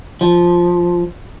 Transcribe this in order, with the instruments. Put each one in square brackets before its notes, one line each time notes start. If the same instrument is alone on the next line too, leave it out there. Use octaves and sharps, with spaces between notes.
[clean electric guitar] F3